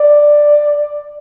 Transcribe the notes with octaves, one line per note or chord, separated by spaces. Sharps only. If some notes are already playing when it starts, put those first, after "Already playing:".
Already playing: D5